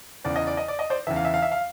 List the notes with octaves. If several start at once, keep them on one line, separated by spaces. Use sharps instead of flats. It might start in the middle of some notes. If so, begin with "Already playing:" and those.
E2 C#3 E3 D5
D#5
D5
D#5
D5
D#5
C5 D5
E2 C#3 E3 E5
F5
E5
F5
E5
F5